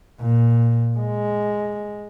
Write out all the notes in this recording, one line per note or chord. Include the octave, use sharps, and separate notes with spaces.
A#2
G#3